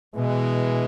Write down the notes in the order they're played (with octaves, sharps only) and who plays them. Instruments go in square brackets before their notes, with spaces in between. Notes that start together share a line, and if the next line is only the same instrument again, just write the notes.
[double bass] B2 [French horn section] E3 G#3